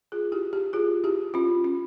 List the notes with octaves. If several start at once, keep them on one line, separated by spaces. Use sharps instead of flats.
F4 G#4
E4 G4
E4 G4
F4 G#4
E4 G4
C#4 F4
C#4